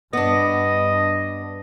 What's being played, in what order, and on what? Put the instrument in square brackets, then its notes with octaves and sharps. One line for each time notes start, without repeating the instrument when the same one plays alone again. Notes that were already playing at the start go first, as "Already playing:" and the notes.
[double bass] G2 [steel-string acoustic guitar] B3 D4 [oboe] D#5